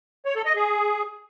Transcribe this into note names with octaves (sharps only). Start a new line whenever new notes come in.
C#5
A4
D#5
G#4